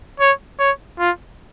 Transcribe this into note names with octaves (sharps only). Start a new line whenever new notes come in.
C#5
C#5
F4